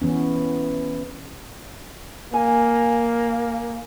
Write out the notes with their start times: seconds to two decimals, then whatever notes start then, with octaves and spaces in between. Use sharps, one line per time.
0.02 E3 B3 C#4
2.34 A#3 G#5